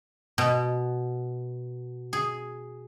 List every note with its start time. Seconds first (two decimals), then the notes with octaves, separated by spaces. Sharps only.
0.38 B2
2.13 G#4